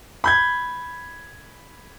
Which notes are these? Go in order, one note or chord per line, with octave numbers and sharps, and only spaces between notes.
B5 G6 G#6